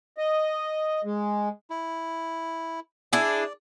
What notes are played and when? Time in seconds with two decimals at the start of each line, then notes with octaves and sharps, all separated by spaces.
0.18 D#5
1.04 G#3
1.70 E4
3.13 D4 E4 G#4 D5